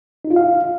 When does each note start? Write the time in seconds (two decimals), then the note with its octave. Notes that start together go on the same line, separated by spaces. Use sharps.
0.25 D#4
0.30 F4
0.36 F5